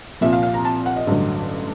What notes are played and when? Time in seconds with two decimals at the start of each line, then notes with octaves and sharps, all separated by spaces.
0.21 C2 A#2 F3 E5
0.33 F5
0.43 F5
0.53 A#5
0.65 A5
0.86 F#5
0.96 D#5
1.07 A1 G2 D3 F#3